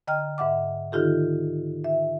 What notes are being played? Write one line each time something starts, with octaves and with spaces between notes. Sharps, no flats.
D3 D#5 G5 A#5 F6
G#2 E5 F#5 D6
D3 D#3 D#4 F4 G4 A4
E5